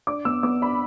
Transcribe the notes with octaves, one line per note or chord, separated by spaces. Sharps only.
D4 D6
B3 E6
B3 D6
D4 B5